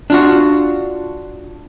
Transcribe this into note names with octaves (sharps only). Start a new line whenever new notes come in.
D4 F4 F#4